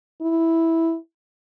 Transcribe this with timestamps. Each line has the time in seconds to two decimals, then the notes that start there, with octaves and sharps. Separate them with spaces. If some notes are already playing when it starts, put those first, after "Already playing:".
0.22 E4